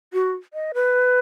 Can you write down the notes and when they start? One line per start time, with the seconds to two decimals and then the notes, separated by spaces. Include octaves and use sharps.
0.13 F#4
0.54 D#5
0.74 B4